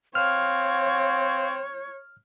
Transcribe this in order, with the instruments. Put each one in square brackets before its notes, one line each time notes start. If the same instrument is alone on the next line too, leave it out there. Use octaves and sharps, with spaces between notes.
[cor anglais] C4 [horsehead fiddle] C#5 [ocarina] F5 [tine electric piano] F6